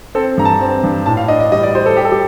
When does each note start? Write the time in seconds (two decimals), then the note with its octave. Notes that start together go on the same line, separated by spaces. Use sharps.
0.15 C4 A4
0.37 G2 A#5
0.45 A5
0.61 C4
0.84 G2
1.06 A2 A5
1.17 F5
1.28 D4 D#5
1.40 D#5
1.52 G3 D#5
1.63 D5
1.75 G3 C5
1.86 A4
1.97 G3 G4
2.05 A4
2.12 G4